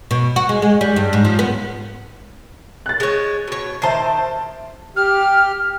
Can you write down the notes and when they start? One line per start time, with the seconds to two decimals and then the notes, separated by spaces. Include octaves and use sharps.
0.11 B2
0.36 F#4
0.49 G#3
0.62 G#3
0.81 G3
0.96 G2
1.13 G#2
1.25 F3
1.39 B3
2.86 F#6 A6
3.00 G#3 C#5
3.48 B2 C#5
3.82 D#3 C5 E5 A5 C7
4.96 G4 F6